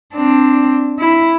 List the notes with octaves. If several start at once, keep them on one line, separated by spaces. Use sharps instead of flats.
C4 D4
E4